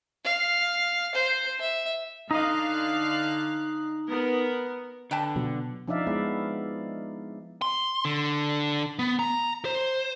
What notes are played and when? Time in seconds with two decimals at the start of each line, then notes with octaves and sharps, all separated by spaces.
0.25 F5
1.15 C5
1.60 E5
2.31 D3 D#4 D#5 F5 F#6
4.09 B3 A#4
5.11 D3 B4 G5 A5
5.36 B2 F#3
5.88 F3 D4 D#4 D5 E5 F5
6.07 G#3 B3 E4 D5
7.62 C6
8.05 D3
8.99 B3
9.19 A#5
9.65 C5